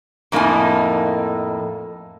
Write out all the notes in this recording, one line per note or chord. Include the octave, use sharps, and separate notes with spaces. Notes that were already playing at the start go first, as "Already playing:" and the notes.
F2 A2 A#3 D#4 G#5